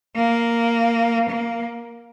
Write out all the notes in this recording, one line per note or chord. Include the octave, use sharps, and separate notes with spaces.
A#3
A#3